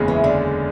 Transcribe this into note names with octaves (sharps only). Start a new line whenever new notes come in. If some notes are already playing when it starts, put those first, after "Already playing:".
Already playing: F#1 E2 C#3 G#3 C#4
E3
D3